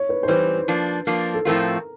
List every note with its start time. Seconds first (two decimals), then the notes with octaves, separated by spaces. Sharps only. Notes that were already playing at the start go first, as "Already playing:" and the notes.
Already playing: C#5
0.09 B4
0.23 C5
0.28 E3 G3 C4 B4
0.68 F3 A#3 D4
1.07 F3 A#3 D4
1.34 A4
1.45 A2 F3 A3 C4 F4 A#4